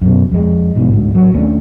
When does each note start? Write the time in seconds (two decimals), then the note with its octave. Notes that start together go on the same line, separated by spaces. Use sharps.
0.02 F#2 B2
0.32 F2 G#3
0.76 G#2 B2 E3
0.90 D2 G#2
1.12 A1 F#3
1.34 D#2 A3 C#4 D4